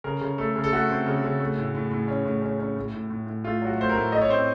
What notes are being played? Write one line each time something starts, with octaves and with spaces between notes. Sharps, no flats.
C#3 A#4
C#3
A3 A4
C#3
A4
A3 F#4
C4
C#3
C#3
A3
A2
A2
A2
C#4
A2
C#4
C#4
A2
A2
A2
A2
A3 F4
F#3 F#4
A3 C5
A#4
A2
A3 D#5
C#5
C4 C5